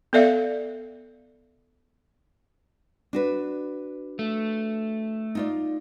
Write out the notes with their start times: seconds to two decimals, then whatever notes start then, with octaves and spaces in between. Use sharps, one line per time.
0.13 B3 A4 D5 E5 F5
3.13 D4 F#4 B4
4.19 A3
5.35 D#4 F4 D5